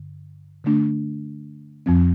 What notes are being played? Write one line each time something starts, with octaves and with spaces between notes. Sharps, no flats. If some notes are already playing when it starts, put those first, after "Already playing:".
Already playing: G2 D3
D3 A3 D4
F2 F3 C4